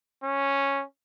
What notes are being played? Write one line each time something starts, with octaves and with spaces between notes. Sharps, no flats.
C#4